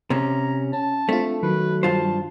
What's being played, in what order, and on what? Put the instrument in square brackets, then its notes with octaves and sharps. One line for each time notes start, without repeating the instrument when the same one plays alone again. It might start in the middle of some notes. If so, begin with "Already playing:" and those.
[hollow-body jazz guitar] C3 C#4 [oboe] A#5
[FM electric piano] C#4 [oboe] A5
[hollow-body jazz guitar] A3 [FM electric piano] C4 D4 F4
[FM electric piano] D#3 [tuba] F#3 [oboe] B4
[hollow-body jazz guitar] G2 F4 C5 [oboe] A5